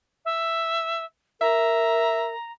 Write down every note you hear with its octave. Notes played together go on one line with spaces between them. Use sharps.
E5
A#4 E5 A#5